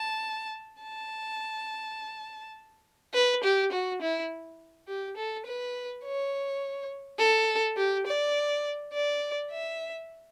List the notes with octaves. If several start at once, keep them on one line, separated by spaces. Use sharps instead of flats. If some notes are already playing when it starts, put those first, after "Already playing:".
Already playing: A5
A5
B4
G4
F#4
E4
G4
A4
B4
C#5
A4
G4
D5
D5
E5